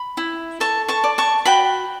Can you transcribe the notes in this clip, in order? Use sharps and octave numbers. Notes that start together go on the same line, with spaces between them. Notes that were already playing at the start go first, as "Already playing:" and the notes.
Already playing: B5
E4
A4 A5 C#6
A5 C#6
D5
A5 C#6
F#4 G5 B5